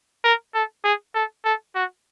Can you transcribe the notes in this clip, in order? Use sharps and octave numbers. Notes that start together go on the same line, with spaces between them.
A#4
A4
G#4
A4
A4
F#4